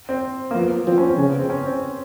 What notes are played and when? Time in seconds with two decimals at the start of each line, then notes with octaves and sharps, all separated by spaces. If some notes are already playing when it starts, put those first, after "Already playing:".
0.09 C4
0.51 A#3
0.56 F3 B3
0.87 F3 C4
0.98 C#4
1.07 C4
1.18 C#3 C#4
1.29 B3
1.39 C4
1.50 C#4
1.65 C4